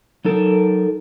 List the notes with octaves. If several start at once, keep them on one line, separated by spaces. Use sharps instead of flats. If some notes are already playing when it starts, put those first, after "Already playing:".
F#3 D#4 A4 A#4